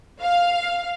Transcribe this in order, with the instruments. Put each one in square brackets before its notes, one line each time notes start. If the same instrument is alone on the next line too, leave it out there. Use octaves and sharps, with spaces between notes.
[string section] F5